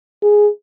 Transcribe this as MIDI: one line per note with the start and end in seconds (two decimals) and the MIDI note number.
0.23 0.49 68